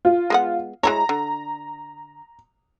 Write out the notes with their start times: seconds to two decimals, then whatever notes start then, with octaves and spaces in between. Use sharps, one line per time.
0.05 F4
0.30 G#3 B3 F#5
0.83 G#3 E4 C#5 A#5
1.09 D3